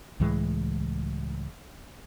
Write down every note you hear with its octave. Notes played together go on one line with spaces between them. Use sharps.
C#2 A2 E3 G#3